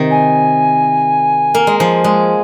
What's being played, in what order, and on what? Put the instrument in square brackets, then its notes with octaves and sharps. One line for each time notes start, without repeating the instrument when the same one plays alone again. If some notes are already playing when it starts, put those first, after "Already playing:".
Already playing: [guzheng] C3 D#3
[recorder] G#5
[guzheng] A#3
G#3
[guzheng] F3 [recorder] G#5
[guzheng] G#3